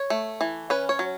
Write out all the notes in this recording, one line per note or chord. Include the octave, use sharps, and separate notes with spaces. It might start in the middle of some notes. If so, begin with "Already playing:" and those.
Already playing: C#5
A3
E3
C#4 B4
C#5
F#3